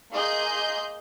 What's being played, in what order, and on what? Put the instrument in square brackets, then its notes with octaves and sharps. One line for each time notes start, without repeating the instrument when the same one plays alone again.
[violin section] A#3 G#4 D#5 C6 G6